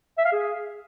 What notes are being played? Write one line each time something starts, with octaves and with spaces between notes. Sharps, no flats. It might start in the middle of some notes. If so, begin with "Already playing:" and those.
E5
F5
G#4